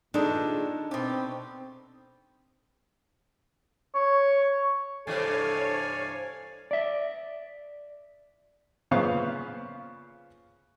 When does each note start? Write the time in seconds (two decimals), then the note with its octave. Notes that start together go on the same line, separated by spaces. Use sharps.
0.14 A#2 D#3 E3 G#3 D4 D#4 A4
0.91 B2 C4 G4
3.95 C#5
5.07 G2 C3 E3 A4 C#5 D5 F5 G#5
6.71 D5 E5
8.91 A#2 C#3 B3 C5 F5 C#6